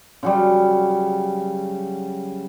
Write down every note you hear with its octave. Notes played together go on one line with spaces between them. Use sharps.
C#3 F#3 G3